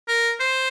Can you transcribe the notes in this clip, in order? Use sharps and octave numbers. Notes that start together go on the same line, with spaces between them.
A#4
C5